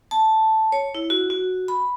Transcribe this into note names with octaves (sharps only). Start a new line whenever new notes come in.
A5
C#5
E4
F#4
F#4
B5